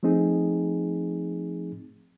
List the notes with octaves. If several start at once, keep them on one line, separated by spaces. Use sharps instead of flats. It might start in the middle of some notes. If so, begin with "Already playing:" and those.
F3 A3 C4 D#4 G#4